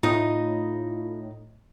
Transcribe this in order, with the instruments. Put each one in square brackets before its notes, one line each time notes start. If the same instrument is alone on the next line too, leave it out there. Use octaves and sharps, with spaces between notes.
[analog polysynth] A2 [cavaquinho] D#4 D#5 [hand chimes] F4